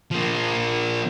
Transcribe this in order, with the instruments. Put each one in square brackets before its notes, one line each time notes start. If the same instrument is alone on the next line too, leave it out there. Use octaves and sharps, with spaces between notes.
[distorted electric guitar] F3 A#3